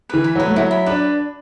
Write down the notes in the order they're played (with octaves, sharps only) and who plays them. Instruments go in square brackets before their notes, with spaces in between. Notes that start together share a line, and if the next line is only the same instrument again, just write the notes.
[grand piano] E3 [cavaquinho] B4
[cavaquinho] B5
[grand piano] F#3 [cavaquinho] B4
[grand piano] A3
[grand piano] F#3 [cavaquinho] E4
[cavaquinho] B5
[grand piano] D4 [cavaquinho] B4